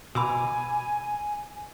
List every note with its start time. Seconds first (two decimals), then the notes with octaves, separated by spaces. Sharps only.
0.15 B2 G#5 B5 D6 E6